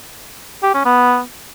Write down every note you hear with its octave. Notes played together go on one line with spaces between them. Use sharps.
G4
C#4
B3